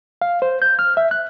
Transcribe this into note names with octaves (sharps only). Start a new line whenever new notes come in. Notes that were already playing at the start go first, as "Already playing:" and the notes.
F5
C5
G6
F6
E5
F#6